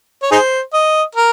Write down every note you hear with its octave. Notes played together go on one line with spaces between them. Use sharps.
C#5
D#4 G#4 C5
D#5
A#4